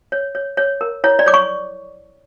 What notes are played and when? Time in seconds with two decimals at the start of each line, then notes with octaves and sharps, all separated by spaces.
0.12 C#5
0.35 C#5
0.57 C#5
0.81 A#4
1.04 E4 C#5
1.19 D5
1.26 C#5 D6
1.34 C#6